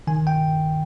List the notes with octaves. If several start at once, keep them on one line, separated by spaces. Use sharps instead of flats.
D#3 G#5
G5